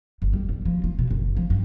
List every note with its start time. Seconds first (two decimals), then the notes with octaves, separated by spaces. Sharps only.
0.22 G1
0.33 G3
0.49 B1
0.65 F3
0.84 F4
0.99 B2
1.11 F#1
1.37 F3
1.50 G2